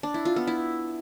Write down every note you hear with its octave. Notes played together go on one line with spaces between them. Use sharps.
D4
E4
F4
B3
E4